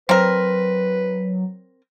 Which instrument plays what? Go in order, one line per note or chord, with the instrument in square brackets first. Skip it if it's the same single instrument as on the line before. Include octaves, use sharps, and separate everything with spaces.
[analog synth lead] F#3 [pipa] C4 A#4 [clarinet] B4